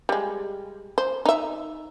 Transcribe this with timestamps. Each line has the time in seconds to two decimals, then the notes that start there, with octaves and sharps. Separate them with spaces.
0.09 G3 G#3
0.98 C5
1.25 D#4 E5